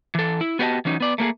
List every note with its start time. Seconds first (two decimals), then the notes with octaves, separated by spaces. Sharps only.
0.15 E3 A4
0.41 E4
0.59 B3 F#4 G4 C#5 D#5 A5
0.85 E3 F#3 C#4 D#4
1.00 B3 D5
1.18 A3 A#3 G4 G#4